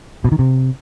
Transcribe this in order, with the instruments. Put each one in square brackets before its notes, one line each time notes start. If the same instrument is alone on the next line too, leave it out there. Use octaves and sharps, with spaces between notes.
[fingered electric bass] B2
D#3
C3